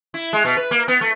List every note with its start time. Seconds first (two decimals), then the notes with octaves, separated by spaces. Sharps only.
0.14 E4
0.33 G#3
0.45 B2
0.57 B4
0.71 A#3
0.88 B3
1.01 A3